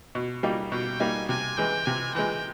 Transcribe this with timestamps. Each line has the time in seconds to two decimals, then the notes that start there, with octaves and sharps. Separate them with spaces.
0.15 B2
0.43 G3 A#3 D#4
0.72 B2 G5
1.00 G3 A#3 D#4 G#5
1.29 C3 G#5
1.57 E3 G#3 G5
1.86 C3 G#5
2.15 E3 G#3 G5